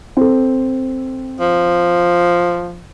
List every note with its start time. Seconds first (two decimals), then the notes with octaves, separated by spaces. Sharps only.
0.17 C4 A4
1.40 F3